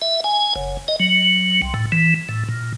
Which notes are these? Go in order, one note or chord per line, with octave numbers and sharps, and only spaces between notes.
E5
G#5
F#1
D#5
F#3
C2
A2
E3
A2
A#2